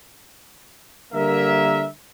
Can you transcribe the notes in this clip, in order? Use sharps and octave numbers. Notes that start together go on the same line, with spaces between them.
D3 G3 A#3 A#4 E5